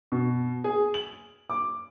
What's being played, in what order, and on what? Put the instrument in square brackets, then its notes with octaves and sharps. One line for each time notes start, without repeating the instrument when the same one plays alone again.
[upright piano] B2
G#4
F#7
D6